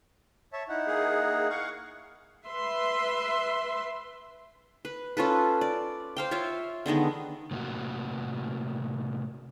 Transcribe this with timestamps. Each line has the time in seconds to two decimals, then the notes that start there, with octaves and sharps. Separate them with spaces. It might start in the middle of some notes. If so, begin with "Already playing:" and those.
0.53 C#5 E5 A5
0.69 D#4 E4 F#5
0.87 A#3 G#4
1.50 F5 F#5 C#6
2.46 B4 E5 C6
4.85 B4
5.17 C#4 F4 A4 B4
5.61 D5
6.17 C5 F5 G5
6.31 F4 C#5 E5 F5
6.86 D3 D#3 G#3 B3
7.51 A2 C3 A#3 F#4